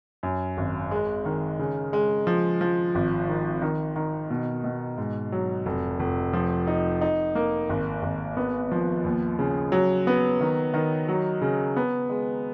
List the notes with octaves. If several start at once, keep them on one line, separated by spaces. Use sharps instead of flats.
F#2
G#1
G#3
D#3
C#3
G#3
F3
F3
G#1
D#3
D#3
D#3
B2
B2
G#2
F#3
F1
F1
F3
D#4
D#4
A#3
G#1
G#1
B3
F3
D#2
C#3
F#3
B3
D#3
D#3
F#3
C#3
B3
G#3